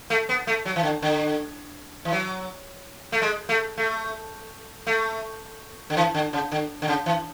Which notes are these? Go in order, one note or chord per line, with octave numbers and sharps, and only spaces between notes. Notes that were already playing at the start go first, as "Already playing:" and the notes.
A3
B3
A3
F#3
E3
D3
D3
E3
F#3
A3
G#3
A3
A3
A3
D3
E3
D3
C#3
D3
D3
C#3
E3